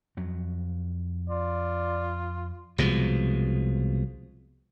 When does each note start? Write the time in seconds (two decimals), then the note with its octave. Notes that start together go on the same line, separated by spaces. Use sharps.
0.17 F2 F#3
1.30 F4 D5
2.78 C2 B2 F3 G#3